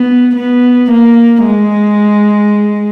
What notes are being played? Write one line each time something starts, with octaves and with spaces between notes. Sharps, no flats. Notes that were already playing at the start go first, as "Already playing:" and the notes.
Already playing: B3
B3
A#3
G#3